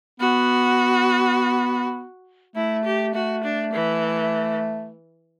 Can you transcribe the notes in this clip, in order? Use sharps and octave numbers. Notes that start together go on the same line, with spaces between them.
B3 F#4
A3 E4
G4
A3 F#4
D4
E3